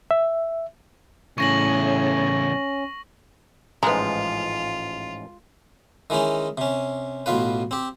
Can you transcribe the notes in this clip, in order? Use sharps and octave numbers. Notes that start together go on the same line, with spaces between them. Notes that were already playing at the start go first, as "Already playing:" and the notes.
E5
E2 A2 C#3 C#4 C#6 A#6 F#7
A1 G#2 F3 G#3 F4 B4 A#5
D#3 E3 G#3 C#4 D#4
C3 C#4
A1 B2 F4 B4
C4 G4